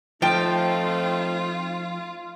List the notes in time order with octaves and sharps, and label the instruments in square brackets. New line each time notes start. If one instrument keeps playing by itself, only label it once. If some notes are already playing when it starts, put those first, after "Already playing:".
[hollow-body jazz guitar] F3 [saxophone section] A3 C4 D#4 [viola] F4 [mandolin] G5 A5